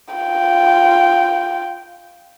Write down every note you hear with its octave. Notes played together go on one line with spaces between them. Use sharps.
F4 G5